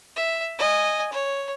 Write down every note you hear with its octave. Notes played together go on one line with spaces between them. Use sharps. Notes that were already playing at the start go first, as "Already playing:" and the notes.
E5
D#5 G#5
C#5